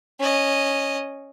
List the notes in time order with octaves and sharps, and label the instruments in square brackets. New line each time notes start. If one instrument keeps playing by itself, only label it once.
[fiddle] C#4 D#5